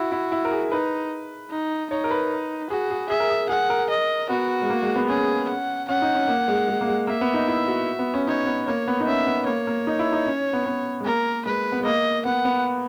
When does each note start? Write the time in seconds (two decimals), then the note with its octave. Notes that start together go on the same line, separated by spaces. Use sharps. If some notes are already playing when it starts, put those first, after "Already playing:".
Already playing: E4 F#4
0.12 E4
0.32 E4
0.45 A#4
0.51 G#4
0.71 D#4 B4
1.50 D#4
1.91 D#4 C#5
2.04 A#4
2.11 B4
2.70 F#4 G#4
2.91 G#4
3.10 G#4 E5
3.20 A#4
3.30 G#4
3.49 G#4 F#5
3.70 A#4
3.90 D#5
4.29 B3 F#4
4.62 G#3
4.70 A#3
4.82 G#3
4.96 B3
5.09 C#4 G#4
5.49 F#5
5.89 C#4 F#5
6.02 D#4
6.15 C#4
6.28 A#3
6.48 G#3
6.68 G#3
6.81 A#3
6.88 G#3
7.07 A#3 E5
7.21 B3
7.34 D#4
7.48 E4
7.68 F#4
7.99 B3
8.14 C#4
8.27 D#4 C#5
8.47 B3
8.67 A#3 C#5
8.88 B3
9.00 D#4
9.07 C#4 E5
9.27 B3
9.46 A#3 C#5
9.67 A#3
9.87 D#4
9.99 E4
10.12 D#4
10.27 C#4
10.53 B3
10.66 B3
11.00 G#3
11.05 A#3 A#4
11.45 G#3 B4
11.72 B3
11.80 G#3
11.85 A#3 D#5
12.25 B3 F#5
12.45 B3